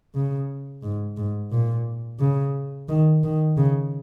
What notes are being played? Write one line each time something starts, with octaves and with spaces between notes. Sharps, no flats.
C#3
G#2
G#2
A#2
C#3
D#3
D#3
C#3